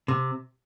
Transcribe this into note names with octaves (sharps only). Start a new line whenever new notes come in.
C3